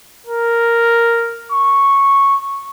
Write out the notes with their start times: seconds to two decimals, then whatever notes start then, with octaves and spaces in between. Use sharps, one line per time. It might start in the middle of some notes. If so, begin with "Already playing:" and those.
0.27 A#4
1.52 C#6